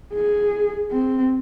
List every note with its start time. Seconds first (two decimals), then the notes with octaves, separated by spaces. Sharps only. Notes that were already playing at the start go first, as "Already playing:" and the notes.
0.14 G#4
0.92 C4